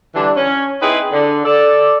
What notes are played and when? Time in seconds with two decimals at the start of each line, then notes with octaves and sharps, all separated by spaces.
0.15 D3 E3 G3 D4
0.36 C#4
0.81 C4 D#4 E4 G#4 B4
1.12 D3
1.45 A4 D5